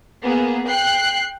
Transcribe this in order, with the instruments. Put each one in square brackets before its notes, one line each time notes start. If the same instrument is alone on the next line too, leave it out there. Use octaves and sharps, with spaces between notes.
[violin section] A#3 B3 G#4
G5 F#6 C7